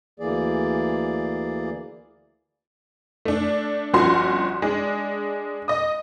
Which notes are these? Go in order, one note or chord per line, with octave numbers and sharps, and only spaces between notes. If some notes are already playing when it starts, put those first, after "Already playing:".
D2 E3 A#3 G#4 D5
A3 D4
G1 F3 C#4 F#4 C6
G#3 D4
D#5 D#6